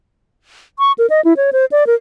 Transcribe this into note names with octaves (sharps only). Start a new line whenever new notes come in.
C#6
A#4
D#5
E4
C#5
C5
D5
A#4